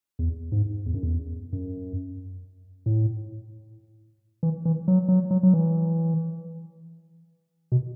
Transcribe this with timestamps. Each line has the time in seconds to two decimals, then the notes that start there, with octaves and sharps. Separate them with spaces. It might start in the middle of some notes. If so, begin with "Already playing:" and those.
0.19 E2
0.52 G#2
0.86 E2
0.94 F#2
1.03 E2
1.53 F#2
2.86 A2
4.43 E3
4.65 E3
4.88 F#3
5.09 F#3
5.31 F#3
5.43 F#3
5.54 E3
7.72 B2